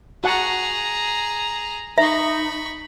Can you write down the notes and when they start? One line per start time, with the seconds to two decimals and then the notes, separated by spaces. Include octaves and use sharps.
0.24 F#4 G#4 F#5 A5 A#5
1.98 D#4 E5 A#5 B5 C#6